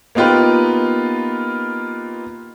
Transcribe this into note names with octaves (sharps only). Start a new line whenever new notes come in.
A#3 B3 D#4 F4 G4 B4